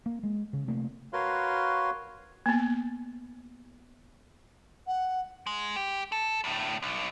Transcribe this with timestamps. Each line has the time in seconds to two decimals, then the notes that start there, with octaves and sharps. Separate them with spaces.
0.06 A#3
0.23 G#3
0.53 C#3
0.68 C3 A3 A#3
1.13 F#4 A#4 B4 C#5 F5 C6
2.46 A#3 B3
4.87 F#5
5.47 G#3
5.76 G4
6.12 A4
6.44 D2 A2
6.82 B1